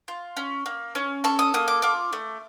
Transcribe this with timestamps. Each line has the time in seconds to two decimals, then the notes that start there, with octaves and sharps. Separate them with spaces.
0.08 F4
0.37 C#4
0.66 A#3
0.95 C#4
1.24 A4 C#6
1.39 D#6
1.54 A#3 D#6
1.68 D6
1.82 F4 D6
2.13 A3